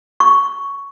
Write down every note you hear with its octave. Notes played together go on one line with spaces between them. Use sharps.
C#6